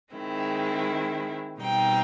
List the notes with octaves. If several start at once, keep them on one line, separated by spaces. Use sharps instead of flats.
D#3 G#3 C4 E4
B2 G3 C4 D#4 G5